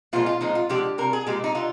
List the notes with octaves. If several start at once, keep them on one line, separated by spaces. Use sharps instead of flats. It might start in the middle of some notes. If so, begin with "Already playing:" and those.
A#2 F3 G#3 F4
F4
A#2 F3 G#3 D#4
F4
D3 F3 G#3 G4
C3 G3 A#4
G#4
A#2 G#3 G4
D#4
D3 F4